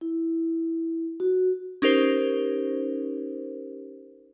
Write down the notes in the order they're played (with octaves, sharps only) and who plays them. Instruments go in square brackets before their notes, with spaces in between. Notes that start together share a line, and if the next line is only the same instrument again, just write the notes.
[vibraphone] E4
F#4
[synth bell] C#4 D#4 G4 A#4 C5